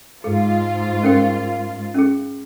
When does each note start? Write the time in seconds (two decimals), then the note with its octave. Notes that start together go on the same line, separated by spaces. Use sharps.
0.24 G#2 F4 G#4
1.03 C#4 A#4 G5
1.94 C#4 G#4